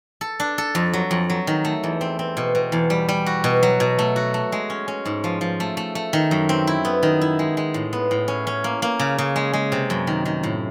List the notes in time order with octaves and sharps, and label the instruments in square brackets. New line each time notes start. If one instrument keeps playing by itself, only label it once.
[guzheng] A4
D4
A4
F2
F#3
F2
F#3
D#3
A3
E2
C4
C4
B2
B2
E2
G3
G3
F#4
B2
F#3
B2
A3
F#4
A3
G#3
C#4
C#4
G#2
F3
F3
A3
A3
A3
D#3
F#2
C4
E4
B3
D#3
E4
G#3
G#3
A2
B3
A2
C#4
C#4
A#3
A#3
C#3
C#3
G#3
G#3
C3
F#2
D#3
D#3
A2